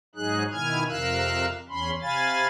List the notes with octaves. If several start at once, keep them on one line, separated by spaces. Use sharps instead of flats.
G#2 F#3 D#4 G#4 F#6
B2 D#3 E4 G#5 F6 G#6
F2 C3 A#4 F5 E6 F#6
E2 C#4 B5 C6
C3 F5 G#5 B5 A6